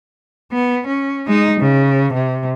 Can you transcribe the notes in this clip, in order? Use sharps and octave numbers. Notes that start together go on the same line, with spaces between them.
B3
C#4
G#3 D#4
C#3
C3